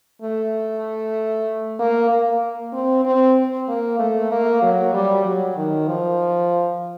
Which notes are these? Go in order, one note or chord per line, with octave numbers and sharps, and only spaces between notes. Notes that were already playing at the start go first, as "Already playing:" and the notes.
A3
A#3
A#3
C4
C4
A#3
A3
A#3
F#3
G3
F#3
D#3
F3